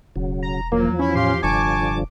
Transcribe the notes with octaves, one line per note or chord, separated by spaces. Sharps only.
E1 C#3 F#3
A#5
E2 F3 F#3 A#3
C#4 E4
A2 G4 F5 C6
F1 G2 D3 F3 G#5 A5 C#6 D6